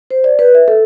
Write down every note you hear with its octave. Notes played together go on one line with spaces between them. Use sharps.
C5
D5
B4
E5
A4